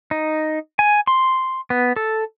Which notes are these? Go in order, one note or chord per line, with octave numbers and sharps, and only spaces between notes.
D#4
G#5
C6
B3
A4